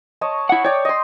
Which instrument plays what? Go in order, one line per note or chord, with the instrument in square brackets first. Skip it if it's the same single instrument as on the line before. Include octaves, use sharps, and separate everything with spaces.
[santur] C#5 D#5 A5
[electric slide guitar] E4 F#5
[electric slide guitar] C#5 [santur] D5 G5
[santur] D#5 C6